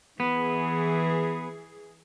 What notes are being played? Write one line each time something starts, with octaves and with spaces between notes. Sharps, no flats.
E3 B3 G#4